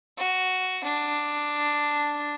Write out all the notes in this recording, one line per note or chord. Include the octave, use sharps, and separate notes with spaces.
F#4
D4